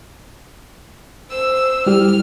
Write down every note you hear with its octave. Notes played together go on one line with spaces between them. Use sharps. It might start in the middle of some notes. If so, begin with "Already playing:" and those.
C5 E6
G3 E4 G4 F6